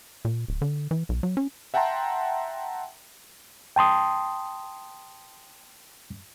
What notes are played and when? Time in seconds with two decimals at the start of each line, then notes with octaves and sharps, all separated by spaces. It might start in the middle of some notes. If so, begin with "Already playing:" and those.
0.25 A#2
0.48 D1
0.62 D3
0.91 E3
1.09 B1
1.23 F#3
1.37 C#4
1.74 E5 F#5 G5 A5 A#5 C6
3.76 G5 A5 C6 D#6